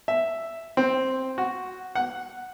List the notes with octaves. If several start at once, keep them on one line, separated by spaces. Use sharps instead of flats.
E5
C4
F#4
F#5